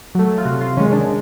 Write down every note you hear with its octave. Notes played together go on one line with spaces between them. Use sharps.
F#3 A3
F4
C3 F#4
F4
D#3 G#3 C#4
D4